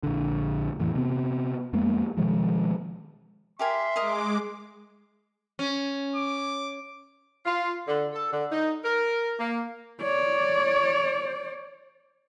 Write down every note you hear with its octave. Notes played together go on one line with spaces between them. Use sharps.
A#1 D3
F2 A2 E3
C3 B3 C4
F2 G#3 A#3 B3
B2 D#3 F3 G#3
G4 A#4 E5 G#5 C6
G#3 A#4 D#5 D6
C#4
D6
F4
D3
A4
D3
D#4
A#4
A#3
C#5 D5